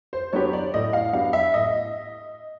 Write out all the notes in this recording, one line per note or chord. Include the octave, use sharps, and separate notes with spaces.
C5
F#3 B3 D4 G4 C#5
D5
A2 D#5
F5
F#3 B3 D4 G4 F5
E5
A2 D#5